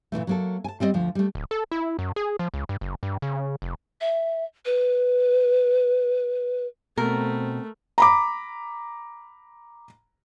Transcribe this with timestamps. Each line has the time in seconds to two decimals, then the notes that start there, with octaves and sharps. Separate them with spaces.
0.12 A#2 C#3 E3 A3
0.27 F#3 A#3 A4
0.64 G#5 A5
0.80 G3 C4 E4 D5 D#5
0.94 D2 F3
1.15 G3 A3
1.35 D1
1.51 A4
1.72 E4
1.99 F#2
2.16 G#4
2.39 F3
2.54 C#2
2.69 G2
2.81 F#1
3.03 G2
3.22 C#3
3.62 F1
4.01 E5
4.65 B4
6.98 B2 A3 C4 A#4
7.98 A#5 B5 D6